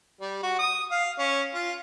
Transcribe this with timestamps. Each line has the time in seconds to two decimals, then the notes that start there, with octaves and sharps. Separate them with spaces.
0.21 G3
0.43 F#4
0.59 D#6
0.91 F5
1.19 C#4
1.54 F4